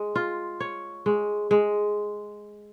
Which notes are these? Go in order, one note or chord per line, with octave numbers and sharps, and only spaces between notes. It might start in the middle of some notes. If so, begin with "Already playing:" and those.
Already playing: G#3
F4
C#5
G#3
G#3